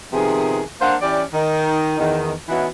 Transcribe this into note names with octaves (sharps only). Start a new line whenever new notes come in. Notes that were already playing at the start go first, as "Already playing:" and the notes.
C3 D#3 F3 B3 G#4
A#3 D4 A#4 C5 F5 F#5
E3 C#4 G4 D5
D#3 D#4
E2 D#3
E3 B3 C#4 D#4 E4 F#4